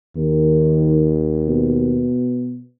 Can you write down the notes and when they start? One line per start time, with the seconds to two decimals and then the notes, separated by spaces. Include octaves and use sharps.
0.17 D#2 D#3
1.48 B2